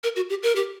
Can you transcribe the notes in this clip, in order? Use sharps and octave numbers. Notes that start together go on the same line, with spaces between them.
A#4
F#4
G4
A#4
G4